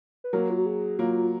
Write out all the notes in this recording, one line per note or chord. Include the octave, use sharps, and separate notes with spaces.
B4
F#3 A#3 A#4
F4
F#4
G#4
F#3 A#3 F4